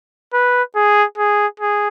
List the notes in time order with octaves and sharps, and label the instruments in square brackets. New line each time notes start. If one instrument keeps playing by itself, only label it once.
[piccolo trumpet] B4
G#4
G#4
G#4